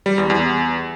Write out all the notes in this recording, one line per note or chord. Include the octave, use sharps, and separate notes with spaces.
G3
E2
E2